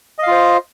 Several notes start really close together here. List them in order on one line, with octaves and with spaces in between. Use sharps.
D#5 F5 F4 C5